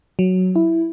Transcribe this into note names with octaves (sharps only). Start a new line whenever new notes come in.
F#3
E4